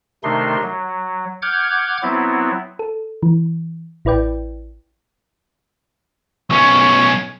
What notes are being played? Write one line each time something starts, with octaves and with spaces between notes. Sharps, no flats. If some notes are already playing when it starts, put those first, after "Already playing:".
C3 D#3 A3 D4 D#4 C6
F#3
F#5 D6 F6 G6 G#6
F#3 B3 C4 E4
A4
E3
A1 E4 B4 D5 G5
B1 C#4 C#6